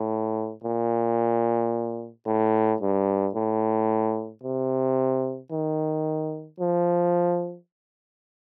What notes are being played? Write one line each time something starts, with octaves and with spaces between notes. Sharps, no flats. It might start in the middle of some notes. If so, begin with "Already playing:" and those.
Already playing: A2
A#2
A2
G2
A2
C3
D#3
F3